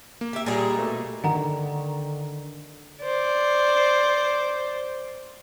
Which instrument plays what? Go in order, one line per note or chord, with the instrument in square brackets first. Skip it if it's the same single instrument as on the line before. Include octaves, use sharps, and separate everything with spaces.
[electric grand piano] A#3
[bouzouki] G4 E5
[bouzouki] A#2 D#4 [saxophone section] G3 G#4
[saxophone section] B2 A3
[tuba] D3 [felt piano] D#3 [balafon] F#5 A#5
[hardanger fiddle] C5 D5